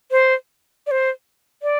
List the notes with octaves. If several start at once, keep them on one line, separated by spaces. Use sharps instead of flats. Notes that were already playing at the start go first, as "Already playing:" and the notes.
C5
D5
C5
D5